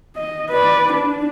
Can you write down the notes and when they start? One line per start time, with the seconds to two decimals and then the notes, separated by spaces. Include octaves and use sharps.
0.16 D#5
0.50 B4 D5
0.93 D4